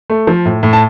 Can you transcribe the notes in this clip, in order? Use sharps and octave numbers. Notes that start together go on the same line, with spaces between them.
A3
F3
A2
A2
A5